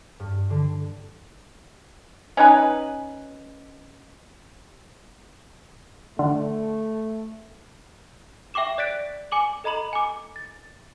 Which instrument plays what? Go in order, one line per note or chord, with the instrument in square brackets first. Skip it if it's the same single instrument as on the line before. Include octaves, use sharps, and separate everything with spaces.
[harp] G2
D3
[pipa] C#4 D#4 B4 G#5
[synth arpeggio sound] D3 [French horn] A3
[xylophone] E5 G5 C#6 D6 E7
D5 F#6 A6 B6 D7
G#5 D6 F#7
A4 D#5 A#5 B5 F#7
G#5 D6
A6